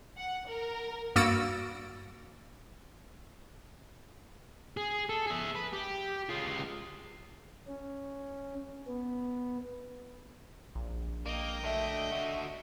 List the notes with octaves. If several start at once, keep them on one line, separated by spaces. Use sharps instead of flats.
F#5
A#4
G2 A#3 F#4 E6 A6 D7
G#4
A4
G#4 E5
B4
G4
G#3 F4
C#4
B3
A#1
A#3 D#5 G5
A3 D4 E5
D3 F#4